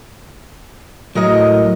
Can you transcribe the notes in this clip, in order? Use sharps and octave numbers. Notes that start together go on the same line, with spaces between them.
A2 F#3 G#3 A#4 D#5